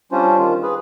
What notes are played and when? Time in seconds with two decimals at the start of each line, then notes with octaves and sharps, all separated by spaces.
0.12 G3 C#4 D4 F4 C5
0.38 D#3 F4
0.63 G#4 B4